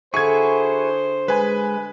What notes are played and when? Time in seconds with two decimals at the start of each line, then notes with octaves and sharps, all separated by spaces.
0.14 D3 E4 F#4 G#4 C5 C#6 G#6
1.28 G#3 B4 G#5 B5